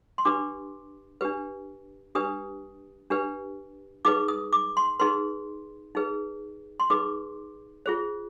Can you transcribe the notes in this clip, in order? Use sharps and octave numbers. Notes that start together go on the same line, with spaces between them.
C6
D4 G4 B4 D6
D4 G4 B4
D4 G4 B4 D#6
D4 G4 B4
D#4 G#4 B4 D6
D#6
D6
C6
D#4 G#4 B4 C6
D#4 G#4 B4
C6
D#4 G#4 B4 D6
F4 G#4 C5